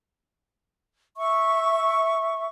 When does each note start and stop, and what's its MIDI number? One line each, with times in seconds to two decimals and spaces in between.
1.16 2.48 76
1.16 2.48 85